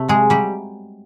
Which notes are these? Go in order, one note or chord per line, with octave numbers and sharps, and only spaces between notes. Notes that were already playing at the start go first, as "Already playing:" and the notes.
Already playing: C3 A3
F#3 G#3 G#4
F#3 G3 G4